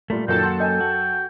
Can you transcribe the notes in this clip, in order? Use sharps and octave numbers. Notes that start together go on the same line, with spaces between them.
A#2 G3 A3 A#4
F#2 A#2 D#3 F#3 A#3 A4 G5 A5
F#5 C6 A6
D#5 G5 G#5
F#4